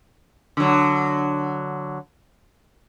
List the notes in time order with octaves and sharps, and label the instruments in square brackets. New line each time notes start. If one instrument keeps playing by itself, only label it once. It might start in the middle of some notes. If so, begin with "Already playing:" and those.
[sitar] D3 F#3